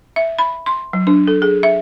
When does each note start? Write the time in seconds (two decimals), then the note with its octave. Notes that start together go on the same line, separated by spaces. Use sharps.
0.16 E5
0.39 B5
0.66 C6
0.93 F#3
1.07 D4
1.27 A4
1.42 G#4
1.63 E5